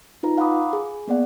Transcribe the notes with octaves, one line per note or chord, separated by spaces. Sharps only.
D#4 F4 B4 A#5
F5 F#5 A#5 B5 D6 D#6
G#4
A#3 B3 D5 F#5